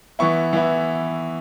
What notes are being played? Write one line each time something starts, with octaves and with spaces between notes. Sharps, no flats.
E3 B3 E4 C#6
E3 B3 E4